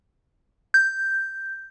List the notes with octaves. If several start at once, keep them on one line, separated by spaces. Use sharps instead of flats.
G6